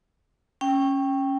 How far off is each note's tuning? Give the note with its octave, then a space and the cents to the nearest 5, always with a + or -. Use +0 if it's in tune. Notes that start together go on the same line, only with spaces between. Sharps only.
C#4 -10 G5 +0